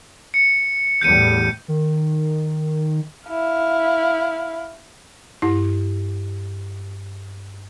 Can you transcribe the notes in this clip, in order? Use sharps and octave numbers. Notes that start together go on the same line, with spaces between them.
C#7
E2 A2 G3 G6 C#7 D#7
D#3
E4 F5
G2 E4